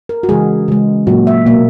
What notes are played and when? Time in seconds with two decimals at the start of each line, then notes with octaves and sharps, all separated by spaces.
0.09 A#4
0.23 F#4
0.29 C#3 E3 G#3 G#4
0.68 C#3 G#3
1.07 A#2 F#3 A#3 F#4
1.27 E5
1.46 B2 A#3